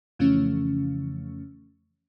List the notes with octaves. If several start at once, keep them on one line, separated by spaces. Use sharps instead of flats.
F2 C#3 E3 F3 A3 C#4